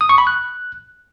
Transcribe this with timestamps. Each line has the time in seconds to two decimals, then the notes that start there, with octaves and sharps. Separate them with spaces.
0.01 D#6
0.09 C#6
0.18 B5
0.27 F#6